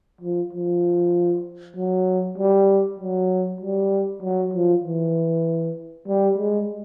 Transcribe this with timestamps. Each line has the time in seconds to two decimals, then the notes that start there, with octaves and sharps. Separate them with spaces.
0.21 F3
0.53 F3
1.76 F#3
2.38 G3
3.00 F#3
3.61 G3
4.22 F#3
4.53 F3
4.84 E3
6.07 G3
6.38 G#3